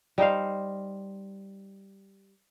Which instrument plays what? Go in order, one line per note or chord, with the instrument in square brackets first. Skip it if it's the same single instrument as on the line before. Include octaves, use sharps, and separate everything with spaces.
[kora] G3 D#4 C5 F5